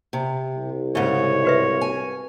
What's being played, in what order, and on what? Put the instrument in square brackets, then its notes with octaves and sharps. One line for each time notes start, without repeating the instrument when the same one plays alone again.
[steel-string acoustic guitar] C3
[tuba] C2
[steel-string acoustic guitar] G#2 C#3 [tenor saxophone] C#5
[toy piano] F#4 B4 E5
[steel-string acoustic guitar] G#5